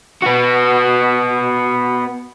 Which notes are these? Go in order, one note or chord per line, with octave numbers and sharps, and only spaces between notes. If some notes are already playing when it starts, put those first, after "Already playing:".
B3 F#4